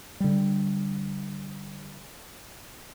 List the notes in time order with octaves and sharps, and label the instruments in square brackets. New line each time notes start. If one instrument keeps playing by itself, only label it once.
[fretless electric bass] D3 G3